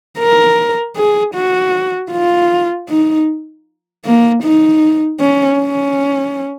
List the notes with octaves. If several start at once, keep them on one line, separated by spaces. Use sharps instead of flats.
A#4
G#4
F#4
F4
D#4
A#3
D#4
C#4
C#4